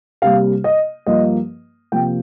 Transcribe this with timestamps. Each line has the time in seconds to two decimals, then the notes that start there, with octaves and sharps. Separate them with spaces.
0.22 C3 G3 A#3 F5
0.64 D#5
1.06 G2 F3 A#3 D#5
1.92 C3 F3 A#3 G5